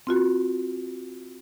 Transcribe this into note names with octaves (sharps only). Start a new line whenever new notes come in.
C4 F4 F#4